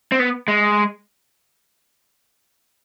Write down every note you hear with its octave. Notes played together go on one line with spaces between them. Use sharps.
C4
B3
G#3